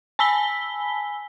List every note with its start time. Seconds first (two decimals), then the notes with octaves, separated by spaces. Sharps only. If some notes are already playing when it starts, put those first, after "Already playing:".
0.19 G#5 A5 B5 E6 B6 G7